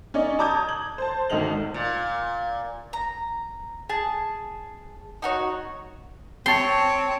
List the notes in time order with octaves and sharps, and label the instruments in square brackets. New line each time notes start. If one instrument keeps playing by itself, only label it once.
[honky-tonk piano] C#4 D#4 D5 D#5
A5 A#5 D6 D#6 G6 G#6
F#7
C5 A5
G#1 D2 D#3 D#5 F7 F#7
[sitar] A#2
[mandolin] A#5
G#4 A5
D#4 F#4 C#5
[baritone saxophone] C4 [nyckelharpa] C#5 [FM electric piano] G5 A5 [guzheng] C6